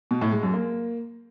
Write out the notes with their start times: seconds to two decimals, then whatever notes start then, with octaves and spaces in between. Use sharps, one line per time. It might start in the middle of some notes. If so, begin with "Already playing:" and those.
0.11 B2
0.21 A2
0.32 G#3
0.43 F#2
0.54 A#3